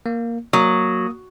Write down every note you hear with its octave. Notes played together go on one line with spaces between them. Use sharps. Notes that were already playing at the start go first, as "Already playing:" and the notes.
A#3
F#3 A#3 D#6